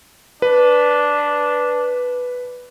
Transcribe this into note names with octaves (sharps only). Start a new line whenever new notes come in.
D4 B4